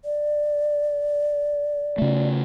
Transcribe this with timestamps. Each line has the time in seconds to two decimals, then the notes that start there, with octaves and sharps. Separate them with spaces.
0.05 D5
1.98 C#3 A3